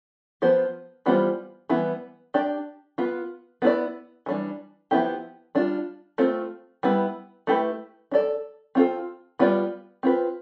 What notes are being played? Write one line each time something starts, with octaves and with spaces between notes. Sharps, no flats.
F3 B3 F4 C5
E3 G3 B3 F4 C5
E3 G3 B3 E4
D4 G4 D5
B3 F4 B4
B3 E4 B4 D5
E3 G3 D4
F3 B3 E4 G4
G3 D4 F4
A3 C4 F4 C5
G3 B3 E4 B4
A3 E4 G4 B4
D4 A4 D5
C4 F4 A4
G3 B3 F4 B4 D5
C4 F4 B4